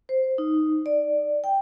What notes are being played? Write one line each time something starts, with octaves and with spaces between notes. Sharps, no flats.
C5
D#4
D5
G5